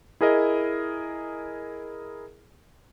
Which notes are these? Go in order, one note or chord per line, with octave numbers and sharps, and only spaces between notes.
E4 G#4 A#4 D#5